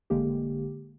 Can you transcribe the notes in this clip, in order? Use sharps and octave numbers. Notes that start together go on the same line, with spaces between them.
A1 D3 G#3 A#3 G4